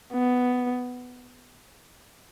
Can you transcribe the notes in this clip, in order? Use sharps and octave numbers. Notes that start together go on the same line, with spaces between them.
B3